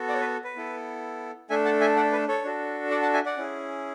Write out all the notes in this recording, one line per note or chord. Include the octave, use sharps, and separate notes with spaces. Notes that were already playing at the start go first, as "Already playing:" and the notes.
Already playing: B3 F#4 A4
D5 F#5
C#5
B4
B4
B3 E4 A4
A3 D4 A4 E5 G#5
F#5 A5
E5 G#5
D5 F#5
B4
A4 C#5
D4 F#4 A4
D5 F#5
F#5 A5
E5 G#5
D5 F#5
C#4 E4 G#4